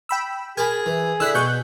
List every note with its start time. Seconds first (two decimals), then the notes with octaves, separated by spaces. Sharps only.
0.09 G5 B5 E6
0.57 G#4 A#4 G#5 A5 B5
0.86 E3
1.20 D3 E4 E6 F#6 B6
1.35 B2 C#6 F#6 G6